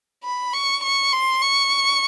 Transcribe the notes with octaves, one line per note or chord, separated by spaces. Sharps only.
B5
C#6
C#6
C6
C#6